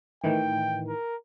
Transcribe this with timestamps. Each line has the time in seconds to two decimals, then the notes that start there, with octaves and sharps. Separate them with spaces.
0.24 A2 D#3 E3 G5
0.88 A#4